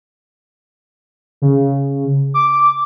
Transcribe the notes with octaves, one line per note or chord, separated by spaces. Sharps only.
C#3
D6